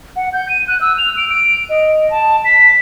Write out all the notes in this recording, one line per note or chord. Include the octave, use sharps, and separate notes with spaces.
F#5
G6
D#7
F#6
E6
F7
D7
D7
D#5
A5
B6